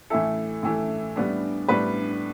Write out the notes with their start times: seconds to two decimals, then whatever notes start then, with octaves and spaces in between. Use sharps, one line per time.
0.10 A2 E3 A3 E4 A4
0.63 A2 E3 A3 E4
1.16 A2 G3 B3 D4
1.68 A2 G3 B3 D4 B4